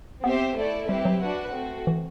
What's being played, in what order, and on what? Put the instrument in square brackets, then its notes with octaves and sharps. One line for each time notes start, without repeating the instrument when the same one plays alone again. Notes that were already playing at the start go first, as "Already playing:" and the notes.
[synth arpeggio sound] B3 [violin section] C4 G4 C5 E5
[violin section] A3 E4 A4 D5
[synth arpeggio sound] G3 [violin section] C4 E4 G4 B4 E5
[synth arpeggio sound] F#3
[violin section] D4 F#4 B4 F#5
A3 C4 F#4
[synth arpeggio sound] E3